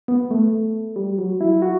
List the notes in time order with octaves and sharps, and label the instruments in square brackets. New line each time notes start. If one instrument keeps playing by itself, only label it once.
[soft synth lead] B3
A3
G3
F#3
E4
F#4